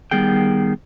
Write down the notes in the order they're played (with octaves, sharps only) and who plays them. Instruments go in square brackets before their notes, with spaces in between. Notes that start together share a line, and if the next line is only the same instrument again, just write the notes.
[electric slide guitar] D#3 G3 B3 G#4 G5